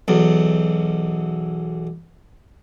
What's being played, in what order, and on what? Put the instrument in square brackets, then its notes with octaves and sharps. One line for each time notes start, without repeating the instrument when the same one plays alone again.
[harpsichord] B1 E2